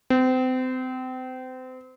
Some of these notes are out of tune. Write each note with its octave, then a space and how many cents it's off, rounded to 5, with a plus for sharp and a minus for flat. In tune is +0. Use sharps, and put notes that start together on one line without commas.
C4 -30